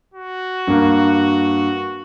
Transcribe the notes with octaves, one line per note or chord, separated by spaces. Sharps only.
F#4
G2 A#3